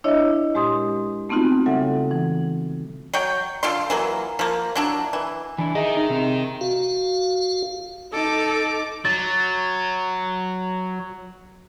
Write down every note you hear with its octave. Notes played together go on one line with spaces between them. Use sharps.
D4 E4 C#5 D#5 E5
A#2 G#3 G4 C6 D#6
A3 B3 C4 D#4 F4 F#4
C#3 G3 A4 E5 F#5
E3
F#3 C#5 G5
D3 F4 F5 C6
E3 F#3 A#3
F3 A#3
F#3 D4 E4
E3
E3 D4 E4 G#5
D#3 G#4 D#5 E5 A#5
D#4
C3 C4 D#4
F#4 F5
D#4 A4 D6
F#3 A6